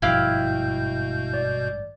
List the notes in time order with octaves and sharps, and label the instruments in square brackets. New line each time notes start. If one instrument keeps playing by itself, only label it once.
[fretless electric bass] G#1 G2 F3 [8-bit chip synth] B2 G6 [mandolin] E4 G4 F5
[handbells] D5